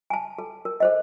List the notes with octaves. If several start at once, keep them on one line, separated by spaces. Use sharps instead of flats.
G#5 A5
A4
A#4
A4 C5 D#5